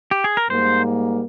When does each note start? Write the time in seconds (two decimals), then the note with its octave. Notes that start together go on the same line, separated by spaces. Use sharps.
0.11 G4
0.24 G#4
0.37 A#4
0.50 G#2 G3 A#3 C5